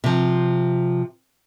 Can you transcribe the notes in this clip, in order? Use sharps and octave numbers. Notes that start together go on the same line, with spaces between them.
C3 F3